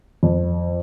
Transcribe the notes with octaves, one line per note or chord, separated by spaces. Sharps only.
F2